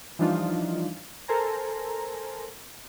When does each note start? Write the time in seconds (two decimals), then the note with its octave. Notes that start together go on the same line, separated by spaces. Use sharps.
0.19 E3 F3 G3 D4 D#4 F4
1.28 A4 A#4 C5 G#5 A#5